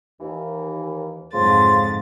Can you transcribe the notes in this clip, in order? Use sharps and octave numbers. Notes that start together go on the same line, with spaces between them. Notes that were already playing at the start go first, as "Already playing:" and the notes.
D#2 E3
F2 G#2 C#3 F3 C6 A6